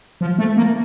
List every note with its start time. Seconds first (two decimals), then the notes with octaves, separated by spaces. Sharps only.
0.21 F3
0.39 A3
0.57 A#3